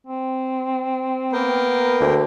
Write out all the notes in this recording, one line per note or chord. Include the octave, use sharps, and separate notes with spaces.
C4
A#3 B3 A#4 G5
D2